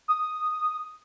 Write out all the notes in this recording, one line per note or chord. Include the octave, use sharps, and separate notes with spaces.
D#6